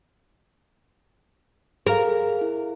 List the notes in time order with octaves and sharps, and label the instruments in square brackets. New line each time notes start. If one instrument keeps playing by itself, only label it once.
[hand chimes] G#4 F5 [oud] A#4
[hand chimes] E4